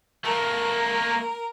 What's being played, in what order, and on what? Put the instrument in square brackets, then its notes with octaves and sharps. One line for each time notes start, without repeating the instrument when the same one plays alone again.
[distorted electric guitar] A3 A#3 [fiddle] A#4